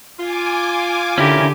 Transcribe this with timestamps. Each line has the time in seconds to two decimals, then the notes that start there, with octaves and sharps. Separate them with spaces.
0.20 F4 G#5 D6
1.18 D3 C#4 E4 G4 A#4